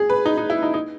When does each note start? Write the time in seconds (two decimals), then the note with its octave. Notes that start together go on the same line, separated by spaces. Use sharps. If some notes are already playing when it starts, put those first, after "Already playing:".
Already playing: G#4
0.10 B4
0.26 D#4
0.38 D#4
0.50 E4
0.63 D#4
0.74 D#4